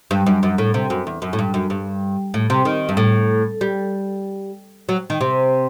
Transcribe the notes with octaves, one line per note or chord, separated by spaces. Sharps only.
G2
F#2
F#2
A2
C3
F#2
E2
F#2
A2
G2
F#2
G2
A2
C3
D#3
G2
A2
G3
F#3
D#3
C3